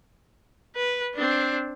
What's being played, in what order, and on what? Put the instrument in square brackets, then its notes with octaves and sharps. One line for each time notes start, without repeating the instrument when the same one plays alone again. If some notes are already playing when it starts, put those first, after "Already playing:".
[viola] B4
C4 D4